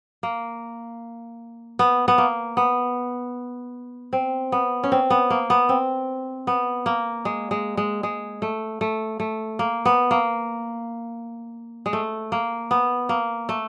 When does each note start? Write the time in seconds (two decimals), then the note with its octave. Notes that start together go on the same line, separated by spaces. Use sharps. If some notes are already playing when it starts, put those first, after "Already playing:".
0.23 A#3
1.79 B3
2.08 B3
2.18 A#3
2.57 B3
4.13 C4
4.52 B3
4.83 C#4
4.92 C4
5.10 B3
5.30 A#3
5.50 B3
5.69 C4
6.47 B3
6.86 A#3
7.25 G#3
7.51 G#3
7.77 G#3
8.03 G#3
8.42 A3
8.81 A3
9.20 A3
9.59 A#3
9.86 B3
10.11 A#3
11.86 G#3
11.93 A3
12.32 A#3
12.71 B3
13.09 A#3
13.49 A3